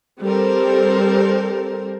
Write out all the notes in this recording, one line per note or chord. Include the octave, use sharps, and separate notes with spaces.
G3 C4 A4 A#4 C5